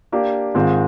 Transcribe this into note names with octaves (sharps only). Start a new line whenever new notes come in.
A#3 D4 G4
G#2 D#3 G#3 C4 F4